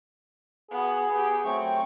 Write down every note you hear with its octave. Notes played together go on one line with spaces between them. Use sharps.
B3 F#4 G#4
B3 G4
F#3 A3 C4 G5 C#6